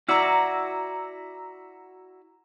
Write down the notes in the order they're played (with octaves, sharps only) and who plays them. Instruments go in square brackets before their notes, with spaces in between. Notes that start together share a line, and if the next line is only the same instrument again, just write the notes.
[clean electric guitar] E4 F#4 D5 [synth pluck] A#5 E6